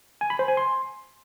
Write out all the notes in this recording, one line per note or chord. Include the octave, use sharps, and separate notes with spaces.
G#5
B5
C5
G#5
C6